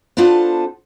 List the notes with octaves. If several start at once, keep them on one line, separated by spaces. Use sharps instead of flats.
B3 D4 F4 A4 B4 C5